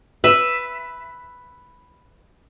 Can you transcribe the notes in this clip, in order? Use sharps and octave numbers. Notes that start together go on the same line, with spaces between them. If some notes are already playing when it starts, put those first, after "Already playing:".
B4 E5